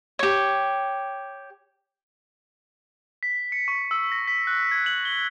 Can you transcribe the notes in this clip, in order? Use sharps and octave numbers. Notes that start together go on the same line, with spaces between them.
G4 C#5
B6
C#7
C#6
E6
A#6
B6
F#6
G#6
F#7
G7